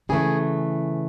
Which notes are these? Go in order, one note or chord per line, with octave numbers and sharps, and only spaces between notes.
C#3 E3 A3 G#4